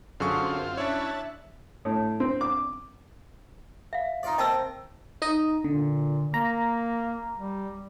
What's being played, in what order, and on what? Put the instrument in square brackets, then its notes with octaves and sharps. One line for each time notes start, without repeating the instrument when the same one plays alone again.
[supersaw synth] F#2 [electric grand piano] D3 G#4 C#6 [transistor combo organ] C4 F4
[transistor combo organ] C#4 E4 [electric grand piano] D4 C#5 [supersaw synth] E5 F#6 A6
[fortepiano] A2
C4
D6
[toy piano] E5 F5
[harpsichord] D#4 F4 D5
[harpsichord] A#3 C4 G5 [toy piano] D#5 A5 E6
[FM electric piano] D#4 D#5
[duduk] A#2 [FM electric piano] D3
[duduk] A#3 [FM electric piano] A#5
[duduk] G3